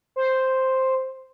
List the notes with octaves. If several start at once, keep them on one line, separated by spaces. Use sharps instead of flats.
C5